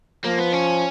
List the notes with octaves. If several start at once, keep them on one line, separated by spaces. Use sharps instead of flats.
F3 A#3
B3
C#4